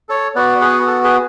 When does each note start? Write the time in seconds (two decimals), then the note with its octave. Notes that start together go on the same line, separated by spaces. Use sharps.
0.09 A4 C#5
0.36 B3 F#4 B4 D5
0.61 G#4 B4
0.87 A4
1.04 G#4 B4